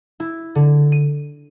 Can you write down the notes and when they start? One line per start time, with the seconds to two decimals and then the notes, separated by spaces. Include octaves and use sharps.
0.20 E4
0.55 D3
0.92 D#7